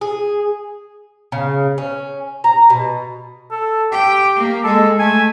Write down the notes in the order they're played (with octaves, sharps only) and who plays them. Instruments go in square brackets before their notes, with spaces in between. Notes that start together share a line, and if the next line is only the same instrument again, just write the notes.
[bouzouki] G#4
C#3
C#4
A#5
B2
[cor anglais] A4
[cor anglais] G4 [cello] G5
[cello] A#3
[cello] G#3 [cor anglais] A4
[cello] A3 [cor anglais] G#5